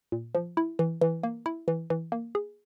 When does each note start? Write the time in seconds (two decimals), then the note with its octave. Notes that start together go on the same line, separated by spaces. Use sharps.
0.12 A#2
0.35 F3
0.57 E4
0.79 E3
1.01 E3
1.23 A#3
1.46 E4
1.68 E3
1.90 E3
2.12 A#3
2.35 G#4